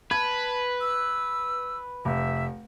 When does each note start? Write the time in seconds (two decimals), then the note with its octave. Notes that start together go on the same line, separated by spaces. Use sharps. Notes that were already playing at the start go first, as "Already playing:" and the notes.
0.11 B4 A5 G#6
0.81 E6
2.05 F1 E5